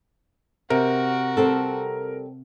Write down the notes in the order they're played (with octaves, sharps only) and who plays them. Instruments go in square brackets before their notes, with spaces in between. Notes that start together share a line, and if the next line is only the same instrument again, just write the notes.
[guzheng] C3 [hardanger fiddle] F#4 [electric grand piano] A#4
[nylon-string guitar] G3 C4 A4